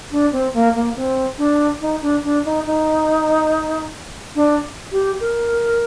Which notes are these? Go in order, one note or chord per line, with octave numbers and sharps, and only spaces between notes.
D4
C4
A#3
A#3
C4
D4
D#4
D4
D4
D#4
D#4
D4
G4
A#4